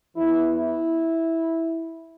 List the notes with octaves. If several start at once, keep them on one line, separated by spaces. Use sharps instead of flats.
E2 E3 E4
E4